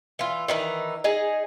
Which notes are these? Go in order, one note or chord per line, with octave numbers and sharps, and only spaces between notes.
E3 F4
D#3 E3 D#4
D#4 G#4 D#5